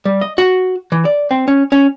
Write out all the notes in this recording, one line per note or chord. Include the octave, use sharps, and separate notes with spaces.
G3
D#5
F#4
E3
D5
C4
C#4
C#4